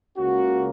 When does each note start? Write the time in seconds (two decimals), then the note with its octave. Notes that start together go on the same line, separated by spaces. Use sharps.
0.17 C#2 C#3 A#3 C#4 F#4